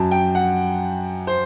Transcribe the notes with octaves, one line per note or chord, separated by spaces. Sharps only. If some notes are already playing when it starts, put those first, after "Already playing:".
Already playing: F#2 F#3 A5
G5
F#5
C5